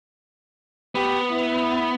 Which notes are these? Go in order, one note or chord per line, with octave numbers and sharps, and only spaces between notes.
B3 G4
E4